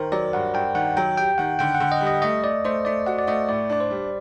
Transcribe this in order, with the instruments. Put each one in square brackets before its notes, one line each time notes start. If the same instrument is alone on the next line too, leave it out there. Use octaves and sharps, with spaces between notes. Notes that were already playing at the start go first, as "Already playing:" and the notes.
Already playing: [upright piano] D#3 [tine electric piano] A#4 C5
[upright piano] F#3 [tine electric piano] D5
[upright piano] G2 [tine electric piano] F#5
[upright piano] G2 [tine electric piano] G5
[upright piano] D#3 [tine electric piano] F#5
[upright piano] F#3 [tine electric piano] G5
[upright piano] G4 [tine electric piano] G5
[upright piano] D#3 [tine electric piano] F#5
[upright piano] D3 [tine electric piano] G5
[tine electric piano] F#5
[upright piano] D3
[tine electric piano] D#5
[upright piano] G3
[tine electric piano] D#5
[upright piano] A3 [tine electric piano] D#5
[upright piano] A3 [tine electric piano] D5
[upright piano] A3 [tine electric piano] C5
[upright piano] A3 [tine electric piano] D5
[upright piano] F#4 [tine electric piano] F#5
[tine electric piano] D5
[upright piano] A3 [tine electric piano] D#5
[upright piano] A2 [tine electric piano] D5
[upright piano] D4 [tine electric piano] D5
[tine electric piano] C5
[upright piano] G3